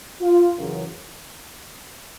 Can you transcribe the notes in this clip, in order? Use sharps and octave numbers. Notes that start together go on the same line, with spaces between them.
F4
F#2 C#3 E3